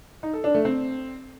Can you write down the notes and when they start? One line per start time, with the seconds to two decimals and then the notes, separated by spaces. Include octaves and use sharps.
0.23 D#4
0.33 A4
0.44 D4
0.54 A3
0.65 C4